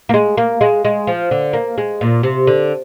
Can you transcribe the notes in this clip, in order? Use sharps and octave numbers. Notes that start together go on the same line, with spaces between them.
A#3
G#3
A#3
G#3
G#3
F3
D3
A#3
G#3
A#2
C3
D3